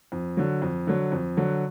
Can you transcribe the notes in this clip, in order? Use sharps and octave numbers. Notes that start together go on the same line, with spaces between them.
F2
D3 F#3
F2
D3 F#3
F2
D3 F#3